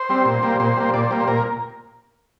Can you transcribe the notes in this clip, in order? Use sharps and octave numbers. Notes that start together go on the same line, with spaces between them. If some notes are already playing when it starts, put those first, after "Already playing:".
Already playing: C5
G3 C4
A#2
G3 A#3
A#2 C5
G3 A#3
A#2 D5
C5
G3 A#3
C5
A#2 A#4